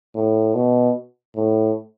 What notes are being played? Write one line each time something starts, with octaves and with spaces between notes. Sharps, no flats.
A2
B2
A2